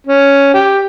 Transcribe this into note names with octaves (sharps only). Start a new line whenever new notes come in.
C#4
G4